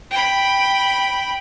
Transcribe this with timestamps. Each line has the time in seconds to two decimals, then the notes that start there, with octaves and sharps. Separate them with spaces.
0.11 G5 B5